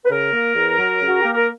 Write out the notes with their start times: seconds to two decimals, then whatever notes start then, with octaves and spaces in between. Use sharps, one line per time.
0.05 B4
0.10 C#3 A#4
0.33 A#3
0.55 E2
0.79 F#3
1.02 C#3 F#4
1.21 A#3 G4
1.34 A#4